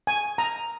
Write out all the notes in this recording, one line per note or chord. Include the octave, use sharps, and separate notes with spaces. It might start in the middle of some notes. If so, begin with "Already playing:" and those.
G#5
A#5